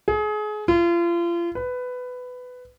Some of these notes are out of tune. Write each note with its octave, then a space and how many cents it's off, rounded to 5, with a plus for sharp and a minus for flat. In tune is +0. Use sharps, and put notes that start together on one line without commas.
G#4 +30
F4 -35
B4 +15